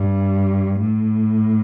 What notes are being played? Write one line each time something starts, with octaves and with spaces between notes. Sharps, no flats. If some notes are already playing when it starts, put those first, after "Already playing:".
Already playing: G2
A2